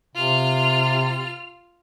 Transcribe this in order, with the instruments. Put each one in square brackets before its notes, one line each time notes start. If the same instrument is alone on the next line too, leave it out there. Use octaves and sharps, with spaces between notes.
[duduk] C3 [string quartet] F4 F6